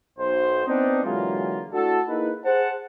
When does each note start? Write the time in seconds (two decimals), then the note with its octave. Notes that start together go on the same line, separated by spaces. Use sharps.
0.19 B1 C5
0.66 B3 C4 D4 D#4
1.04 D3 E3 F#3 G#3 A#3 F4
1.72 A3 D4 E4 F#4 A4
2.08 A#3 D#4 E4 G#4 B4
2.45 G#4 C5 F#5 A5